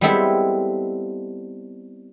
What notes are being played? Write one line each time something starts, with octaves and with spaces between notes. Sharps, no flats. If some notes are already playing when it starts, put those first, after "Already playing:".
G3 G#3 B3 C4 E4 A4